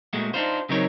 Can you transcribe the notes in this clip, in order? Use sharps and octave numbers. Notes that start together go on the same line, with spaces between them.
A#2 G#3 A3 F#4
D4 D#4 F4 C5
C#3 F#3 C4 D#4 A#4 C#5